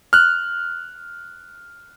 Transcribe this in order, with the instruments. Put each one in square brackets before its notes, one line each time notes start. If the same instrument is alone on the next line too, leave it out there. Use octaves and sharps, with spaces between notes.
[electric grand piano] F6 F#6